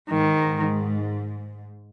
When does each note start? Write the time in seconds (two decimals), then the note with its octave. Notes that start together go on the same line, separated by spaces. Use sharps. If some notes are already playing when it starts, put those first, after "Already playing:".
0.10 G#2 D#3